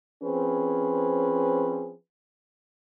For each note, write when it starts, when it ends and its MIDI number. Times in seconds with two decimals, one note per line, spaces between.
0.23 1.93 53
0.23 1.93 60
0.23 1.93 61
0.23 1.93 68
0.23 1.93 71